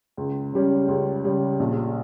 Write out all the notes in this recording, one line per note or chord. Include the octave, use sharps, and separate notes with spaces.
C#2
C#3 G3 C#4
C#2
C#3 G3 C#4
A#1